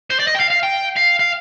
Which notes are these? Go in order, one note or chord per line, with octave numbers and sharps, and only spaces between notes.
C5
D5
D#5
G5
F5
F5
G5
F5
F5